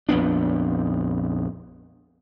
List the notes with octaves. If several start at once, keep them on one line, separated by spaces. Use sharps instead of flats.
A#1 F2 B3 D4